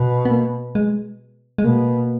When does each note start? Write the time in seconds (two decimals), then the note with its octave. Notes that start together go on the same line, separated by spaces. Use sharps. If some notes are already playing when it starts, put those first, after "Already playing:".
Already playing: B2
0.25 B3
0.31 A#3
0.75 G#3
1.58 G#3
1.64 B2 A#3